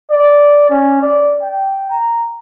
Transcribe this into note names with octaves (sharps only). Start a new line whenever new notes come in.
D5
C#4
D5
G5
A#5